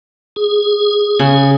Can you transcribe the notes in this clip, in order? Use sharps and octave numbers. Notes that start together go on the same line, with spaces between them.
G#4
C#3